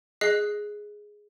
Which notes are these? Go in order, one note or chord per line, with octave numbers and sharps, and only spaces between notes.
G#4 D#5 F#6 C7